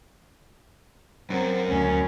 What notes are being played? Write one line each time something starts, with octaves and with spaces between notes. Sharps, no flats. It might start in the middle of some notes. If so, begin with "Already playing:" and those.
F#2 F#3 C4
D2 C#4